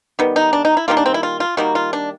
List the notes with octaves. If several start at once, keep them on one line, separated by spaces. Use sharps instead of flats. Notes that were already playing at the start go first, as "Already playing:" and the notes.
D#3 G3 B3
D#4
D4
D#4
E4
D#3 G3 A#3 F4
D4
C4
E4
F4
F4
D#3 G3 A#3 F#4
F4
D4